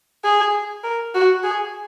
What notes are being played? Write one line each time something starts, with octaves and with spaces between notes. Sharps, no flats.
G#4
A#4
F#4
G#4